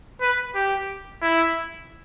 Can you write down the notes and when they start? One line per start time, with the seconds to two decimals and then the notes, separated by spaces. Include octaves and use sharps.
0.21 B4
0.55 G4
1.22 E4